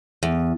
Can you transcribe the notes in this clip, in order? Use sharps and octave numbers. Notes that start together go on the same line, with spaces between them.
E2